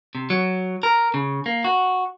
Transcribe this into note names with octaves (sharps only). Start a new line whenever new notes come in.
C3
F#3
A#4
C#3
A#3
F#4